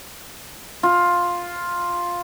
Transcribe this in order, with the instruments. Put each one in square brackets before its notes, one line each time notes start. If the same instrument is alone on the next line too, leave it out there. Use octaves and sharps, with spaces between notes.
[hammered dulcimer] F4